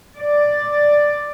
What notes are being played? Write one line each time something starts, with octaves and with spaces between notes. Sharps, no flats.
D5